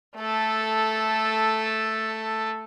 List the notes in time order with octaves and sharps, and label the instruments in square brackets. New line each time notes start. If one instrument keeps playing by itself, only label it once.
[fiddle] A3 A4